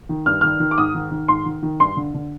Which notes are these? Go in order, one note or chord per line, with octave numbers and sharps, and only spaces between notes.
D#3
G2 F6
D#3 F6
D#3
D6
G#2 D#6
D#3
D#3
G#2 C6
D#3
D#3
G2 C6
D3
D3